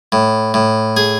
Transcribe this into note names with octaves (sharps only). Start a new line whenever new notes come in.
A2
A2
G#4